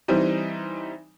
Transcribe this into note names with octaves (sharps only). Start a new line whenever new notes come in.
E3 G3 C4 D#4